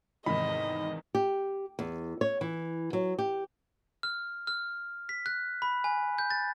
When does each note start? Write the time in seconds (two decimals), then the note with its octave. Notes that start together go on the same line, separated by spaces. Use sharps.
0.26 E2 G#2 C3 D#3 D#5 B5
1.15 G4
1.79 E2
2.21 C#5
2.41 E3
2.93 F#3
3.19 G4
4.03 F6
4.47 F6
5.09 B6
5.26 F#6
5.62 B5
5.84 G#5
6.18 G6
6.30 A6